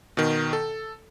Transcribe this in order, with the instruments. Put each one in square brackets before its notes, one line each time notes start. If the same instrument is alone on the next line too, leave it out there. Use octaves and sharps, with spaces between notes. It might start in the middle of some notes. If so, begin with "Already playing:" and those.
[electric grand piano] B2 D#3
A4